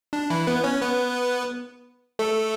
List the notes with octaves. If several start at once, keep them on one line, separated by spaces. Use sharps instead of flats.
D4
E3 E4
B3 B4
C#4 C#5
B3 B4
A3 A4